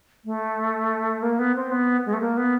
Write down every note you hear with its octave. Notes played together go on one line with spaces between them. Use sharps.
A3
A#3
B3
C4
B3
G#3
A3
A#3
B3